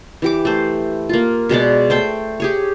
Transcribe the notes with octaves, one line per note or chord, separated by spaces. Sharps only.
E3 G4 D6
A3 C5
A#3 F4
B2 G#3 C#5 D5
A3 C5 G5
G4 G#4 C#5